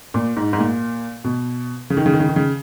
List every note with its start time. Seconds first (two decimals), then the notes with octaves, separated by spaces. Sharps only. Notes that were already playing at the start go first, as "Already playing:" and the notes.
0.14 A#2
0.36 G#2
0.53 G#2
0.58 A#2
1.24 B2
1.90 C#3
1.97 D#3
2.06 C#3
2.13 D#3
2.20 C#3
2.29 D#3
2.36 C#3